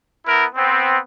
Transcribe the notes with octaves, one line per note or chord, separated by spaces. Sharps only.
B3 E4 A#4
B3 C4